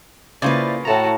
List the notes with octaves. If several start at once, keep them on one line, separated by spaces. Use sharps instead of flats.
C#3 A#3 E4 F4 B4 C5 D5
A2 F#4 A4 A5 A#5